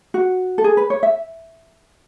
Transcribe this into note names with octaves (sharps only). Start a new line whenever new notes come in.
F#4
A4
G#4
B4
C#5
E5